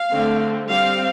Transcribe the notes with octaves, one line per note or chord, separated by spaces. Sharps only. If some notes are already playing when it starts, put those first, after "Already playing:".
Already playing: F5
D3 A3 C4
G3 C4 F5